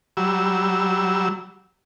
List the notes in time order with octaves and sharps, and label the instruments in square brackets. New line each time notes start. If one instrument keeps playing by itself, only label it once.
[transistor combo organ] F#3 G3 E6